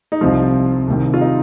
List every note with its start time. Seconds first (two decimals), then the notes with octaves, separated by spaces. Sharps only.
0.12 D#4
0.21 C2 C3 F3 F4
0.88 C2 C3 D#3
1.14 F4
1.21 D#4